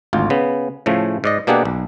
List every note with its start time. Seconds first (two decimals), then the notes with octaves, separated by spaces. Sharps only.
0.13 G#1 D2 F4
0.30 C#3 B3
0.86 A2 C#3 F3 A3
1.24 G#2 D5 D#5
1.47 B2 A#3 D4 G4 G#4 F#5
1.65 B1